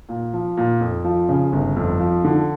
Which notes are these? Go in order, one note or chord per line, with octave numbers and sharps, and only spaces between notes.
A#2
F3
A#2
F2
F3
C#3
G1
F2
F3
D3